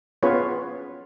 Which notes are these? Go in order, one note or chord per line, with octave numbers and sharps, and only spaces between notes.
B3 C#4 F4 G#4 B4 C#5